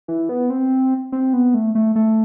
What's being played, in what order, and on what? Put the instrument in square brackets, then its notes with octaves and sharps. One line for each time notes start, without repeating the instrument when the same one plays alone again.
[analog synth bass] E3
B3
C4
C4
B3
A3
A3
A3